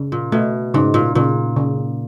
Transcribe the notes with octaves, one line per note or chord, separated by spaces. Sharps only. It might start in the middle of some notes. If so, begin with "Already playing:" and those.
Already playing: C#3
A#2
B2 A3
G#2 C#3
A#2
A#2 C#3
C#3